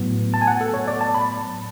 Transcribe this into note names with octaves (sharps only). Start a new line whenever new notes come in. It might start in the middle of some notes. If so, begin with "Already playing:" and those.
Already playing: A2 F#3 B3
A5
G#5
F#5
A4
C#5
D5
A5
B5